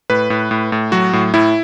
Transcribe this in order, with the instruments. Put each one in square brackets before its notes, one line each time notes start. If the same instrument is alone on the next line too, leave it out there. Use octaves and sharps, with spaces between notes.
[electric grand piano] A2 B4
A2
A2
A2
F#3 F#4
A2
A2 E4